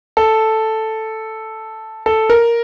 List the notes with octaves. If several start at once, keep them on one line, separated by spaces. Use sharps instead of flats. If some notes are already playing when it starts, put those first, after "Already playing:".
A4
A4
A#4